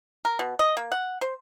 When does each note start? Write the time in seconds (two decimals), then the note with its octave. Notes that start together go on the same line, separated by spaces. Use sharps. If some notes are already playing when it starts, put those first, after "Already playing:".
0.25 A#4
0.39 B2
0.59 D#5
0.77 A#3
0.92 F#5
1.21 C5